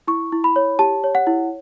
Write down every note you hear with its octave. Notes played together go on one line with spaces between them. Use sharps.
E4 C#6
E4
B5
C#5
G4 A5
C#5
F#5
E4